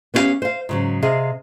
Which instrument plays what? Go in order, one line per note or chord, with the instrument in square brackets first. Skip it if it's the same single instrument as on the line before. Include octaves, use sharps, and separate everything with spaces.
[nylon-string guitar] B3 C#4 E4 G4 F5
C5 F5
G#2 C#3 F#3
C3 G#4 D#5 F5